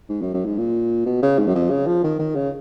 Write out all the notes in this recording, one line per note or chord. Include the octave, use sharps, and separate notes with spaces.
G#2
F#2
F#2
G#2
A#2
B2
C#3
G#2
F#2
F2
C#3
F3
D#3
D#3
C#3